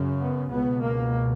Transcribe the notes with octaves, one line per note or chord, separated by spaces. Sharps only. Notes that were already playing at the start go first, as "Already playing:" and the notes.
Already playing: F#2 C#3
B3
C#2 B2 B3
A#3